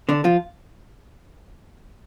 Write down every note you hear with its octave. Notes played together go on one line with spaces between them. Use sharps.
D3 D4
F3 F4